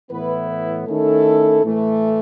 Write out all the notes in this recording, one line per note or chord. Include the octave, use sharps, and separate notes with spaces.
A2 E3 B3 E4 B4
B4
D#3 A3 C#4 E4 A4
A2 E3 A3